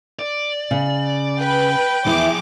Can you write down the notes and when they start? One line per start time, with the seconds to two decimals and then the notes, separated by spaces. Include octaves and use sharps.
0.19 D5
0.71 C#3
1.40 B4 G5
2.06 E2 F3 E4 G#4 D6